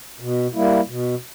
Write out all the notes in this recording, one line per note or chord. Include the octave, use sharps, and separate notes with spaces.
B2
G3 A#3 E4
B2